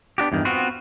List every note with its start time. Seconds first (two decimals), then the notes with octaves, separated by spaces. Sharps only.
0.18 B3 D4 F#4 G4
0.32 E2 G2 D#3
0.45 B3 C4 F4 F#4